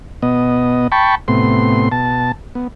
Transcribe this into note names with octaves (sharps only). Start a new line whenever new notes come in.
B2 B3 D#5
G5 A5 B5 C#6
A2 C3 B3 C6
B2 A5
B3